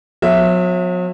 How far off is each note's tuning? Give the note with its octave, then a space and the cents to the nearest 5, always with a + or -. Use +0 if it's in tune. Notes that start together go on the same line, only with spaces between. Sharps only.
F#3 -45 B3 +25 E5 +0